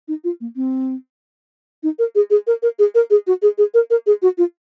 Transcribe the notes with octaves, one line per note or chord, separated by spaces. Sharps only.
D#4
F4
A#3
C4
D#4
A#4
G#4
G#4
A#4
A#4
G#4
A#4
G#4
F#4
G#4
G#4
A#4
A#4
G#4
F#4
F4